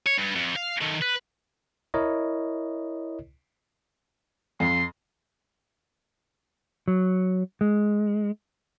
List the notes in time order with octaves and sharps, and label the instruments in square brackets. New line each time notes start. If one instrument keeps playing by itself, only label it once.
[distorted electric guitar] C#5
G2
F2
F5
D#3 A3
B4
[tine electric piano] E4 A#4 C#5 D#5
[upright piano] F2 [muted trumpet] C6
[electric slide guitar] F#3
G#3